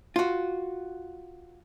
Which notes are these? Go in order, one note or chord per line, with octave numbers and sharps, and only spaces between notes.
F4 F#4